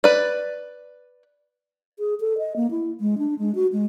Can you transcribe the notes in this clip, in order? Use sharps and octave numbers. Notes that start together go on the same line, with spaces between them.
B4 D5
G#4
A4
D#5
A#3
E4
G#3
D4
G#3
F#4
G#3